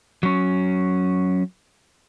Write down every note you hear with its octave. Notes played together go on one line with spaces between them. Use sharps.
F#3 C#4